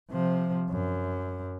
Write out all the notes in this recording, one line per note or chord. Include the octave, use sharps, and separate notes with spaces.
C3 F3
F#2